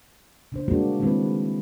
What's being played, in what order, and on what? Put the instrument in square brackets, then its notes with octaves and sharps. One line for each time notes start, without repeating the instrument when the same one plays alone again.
[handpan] C#3 D4 C5
G3 G#3 A#3 D4 F#4 G#4
D#3 G#3 A#3 C4 E4 B4